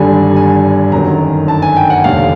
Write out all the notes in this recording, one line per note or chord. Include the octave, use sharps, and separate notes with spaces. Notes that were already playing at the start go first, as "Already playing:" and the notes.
Already playing: G#1 G2 D3 G3 G#5
G#5
G1 F#2 D#3 A#5
A5
G#5
G5
F#5
F1 D#2 D3 F5